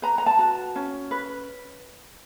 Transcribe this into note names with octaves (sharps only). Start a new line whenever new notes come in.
B4 A#5
A#5
A5
F#4
C#4
B4